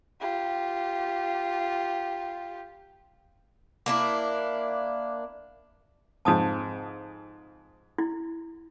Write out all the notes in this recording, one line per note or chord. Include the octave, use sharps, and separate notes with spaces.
F4 G4
A#3 D4 E4
F2 G#2 A5 D#6
E4